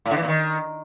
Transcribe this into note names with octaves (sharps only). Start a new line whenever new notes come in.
A2
D3
E3
A#2
D#3